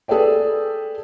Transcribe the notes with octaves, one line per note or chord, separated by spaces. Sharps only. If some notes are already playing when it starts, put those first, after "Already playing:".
G#4 A4 B4 D5 G5